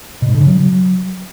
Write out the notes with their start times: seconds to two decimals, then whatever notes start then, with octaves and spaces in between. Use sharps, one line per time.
0.22 B2
0.28 G#2
0.35 D3
0.41 C#3
0.47 F#3